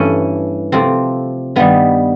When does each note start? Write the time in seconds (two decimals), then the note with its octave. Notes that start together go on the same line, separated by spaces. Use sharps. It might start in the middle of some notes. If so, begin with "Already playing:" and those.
Already playing: G2 E3 A3 C#4
0.72 C3 F3 A3 C4
1.56 G2 D#3 G3 B3